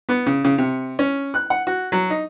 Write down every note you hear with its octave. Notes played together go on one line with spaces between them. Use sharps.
B3
C#3
C#3
C3
C#4
F#6
F#5
F#4
F#3
D#4